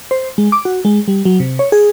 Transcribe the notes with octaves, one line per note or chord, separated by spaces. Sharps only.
C5
G#3
D6
F#4
G#3
G3
F#3
C3
C#5
G#4